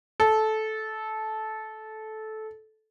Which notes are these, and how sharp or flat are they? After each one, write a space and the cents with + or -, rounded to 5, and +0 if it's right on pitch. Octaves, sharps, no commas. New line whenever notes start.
A4 -15